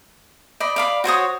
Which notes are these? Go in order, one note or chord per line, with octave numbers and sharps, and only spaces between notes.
D5 D#5 B5
D5 F5 B5
F#4 C5 C#5 D#6